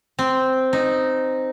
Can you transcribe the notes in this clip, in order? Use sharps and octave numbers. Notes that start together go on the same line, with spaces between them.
C4
D#4